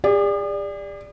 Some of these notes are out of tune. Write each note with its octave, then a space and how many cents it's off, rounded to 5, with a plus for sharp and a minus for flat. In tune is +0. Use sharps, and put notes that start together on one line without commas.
G#4 -45 D5 +0